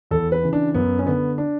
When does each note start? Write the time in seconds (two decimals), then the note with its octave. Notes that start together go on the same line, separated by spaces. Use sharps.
0.11 E2 A4
0.32 B4
0.43 C#3 E3
0.53 D4
0.75 F#2 B3
0.99 C#4
1.06 D3 B3
1.38 D4